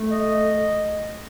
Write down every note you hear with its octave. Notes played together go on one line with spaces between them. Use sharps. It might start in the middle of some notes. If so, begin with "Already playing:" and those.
Already playing: A3
D#5